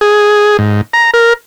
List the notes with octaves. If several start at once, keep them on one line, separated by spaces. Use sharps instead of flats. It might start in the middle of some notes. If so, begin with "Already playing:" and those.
G#4
G#2
A#5
A#4